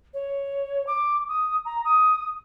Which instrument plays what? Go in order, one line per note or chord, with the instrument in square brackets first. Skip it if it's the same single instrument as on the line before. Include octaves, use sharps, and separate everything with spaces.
[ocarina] C#5
D6
D#6
A#5
D#6